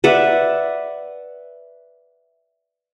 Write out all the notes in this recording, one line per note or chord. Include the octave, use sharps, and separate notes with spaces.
B4 D5 E5 F#5